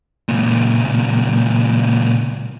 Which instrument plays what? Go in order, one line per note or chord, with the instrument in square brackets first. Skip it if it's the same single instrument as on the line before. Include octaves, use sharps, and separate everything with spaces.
[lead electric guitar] C#2 A#2